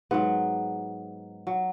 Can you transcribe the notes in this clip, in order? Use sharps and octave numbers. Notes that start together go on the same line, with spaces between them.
G#2 F#3 B3
F#3